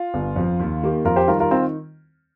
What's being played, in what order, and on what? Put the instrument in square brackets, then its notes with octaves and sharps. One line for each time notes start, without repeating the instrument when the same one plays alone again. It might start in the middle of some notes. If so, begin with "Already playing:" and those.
Already playing: [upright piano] F4
[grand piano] G1
F2 F3
D#2
D#3 A#3 G4
[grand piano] F2 [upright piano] F4 A#4
[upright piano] G4 C5
[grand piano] D#3 G3 [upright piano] F4 A#4
[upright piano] F4 A#4
[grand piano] D#3 [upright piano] C4 F4